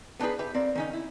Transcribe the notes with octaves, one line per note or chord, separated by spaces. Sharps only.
B3 D4 D#4 F#4 G#4 B4
G4 B4 E5
A#3 C4 D5
D#3 C#4 D#4
E4